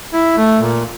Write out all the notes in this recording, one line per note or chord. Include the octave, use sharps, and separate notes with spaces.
E4
A3
A#2